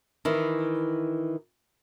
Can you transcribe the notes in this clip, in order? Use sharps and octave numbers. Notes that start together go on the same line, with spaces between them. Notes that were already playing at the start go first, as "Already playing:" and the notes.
D#3 E3 E4